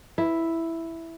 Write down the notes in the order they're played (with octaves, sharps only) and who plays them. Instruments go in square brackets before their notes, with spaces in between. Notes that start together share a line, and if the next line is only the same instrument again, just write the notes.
[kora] E4